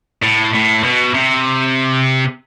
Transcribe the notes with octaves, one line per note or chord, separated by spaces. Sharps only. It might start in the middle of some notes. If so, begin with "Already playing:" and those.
A2
A2
B2
C3